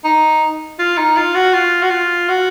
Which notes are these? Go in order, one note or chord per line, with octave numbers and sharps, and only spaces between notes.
D#4
F4
D#4
F4
F#4
F4
F#4
F4
F#4